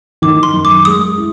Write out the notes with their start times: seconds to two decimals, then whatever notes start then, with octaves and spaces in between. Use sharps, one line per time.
0.22 D#3 D6
0.43 C6
0.53 F#2
0.65 D6
0.85 G#3 D#6
1.18 E4